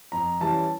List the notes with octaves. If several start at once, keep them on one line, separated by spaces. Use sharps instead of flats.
F2 A#5
E3 G3 C#4 A5